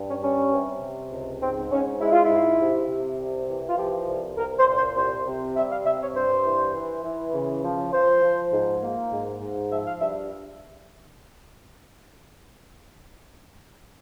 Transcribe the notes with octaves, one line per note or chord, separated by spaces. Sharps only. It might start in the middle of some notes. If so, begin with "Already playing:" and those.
Already playing: G2
C#4
G3 C#4
C3
C3
C#2
G#2 C4
G#2 C#4
G#3 E4
F4
E4
G#2
C3
C3
C2
E3
F4
F3 G4
C2
C2 A#4
C5
A#2
C5
C2 C5
C3
G3 E5
F5
C3 E5
C#5
G2 C5
E3
E3
E3
C#3
F3
F3 C5
F3
G#2
A#3
G#2
G#2
F3 E5
F5
G2 E5